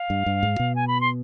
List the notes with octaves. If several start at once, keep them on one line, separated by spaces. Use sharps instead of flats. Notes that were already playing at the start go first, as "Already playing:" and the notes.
Already playing: F5
G2
G2
G#2
B2
G#5
B5
C6